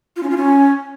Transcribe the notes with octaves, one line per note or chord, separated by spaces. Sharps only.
F4
C#4
F4
C#4